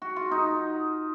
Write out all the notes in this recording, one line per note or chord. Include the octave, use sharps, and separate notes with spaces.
F#4
F4
D#4